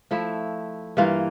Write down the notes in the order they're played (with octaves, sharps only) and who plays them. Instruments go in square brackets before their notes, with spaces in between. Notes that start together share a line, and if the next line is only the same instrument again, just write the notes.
[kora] F3 A3 E4
G2 E3 A#3 F4